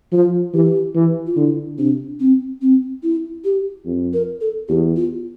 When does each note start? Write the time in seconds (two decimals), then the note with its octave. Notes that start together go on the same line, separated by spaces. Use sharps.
0.12 F3 F4
0.54 E3 G4
0.95 E3
1.26 F4
1.36 D3 E4
1.78 C3 D4
2.20 C4
2.61 C4
3.03 E4
3.44 G4
3.86 F2
4.13 A#4
4.41 A4
4.68 E2 G4
4.96 F4